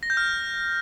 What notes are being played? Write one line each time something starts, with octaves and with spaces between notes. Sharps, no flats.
A#6
G6
F6